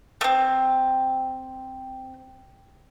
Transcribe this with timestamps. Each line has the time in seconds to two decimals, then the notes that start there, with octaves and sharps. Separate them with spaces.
0.21 A3 C4